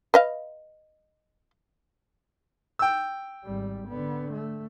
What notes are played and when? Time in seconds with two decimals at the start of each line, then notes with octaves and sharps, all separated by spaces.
0.14 B4 D#5 F5
2.79 G5 E6
3.44 G#1 G3
3.88 D3 B3
4.32 A3